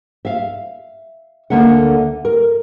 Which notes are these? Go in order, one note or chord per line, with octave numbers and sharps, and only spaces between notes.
E5 F5
D2 D3 A#3 E5 F#5
A#4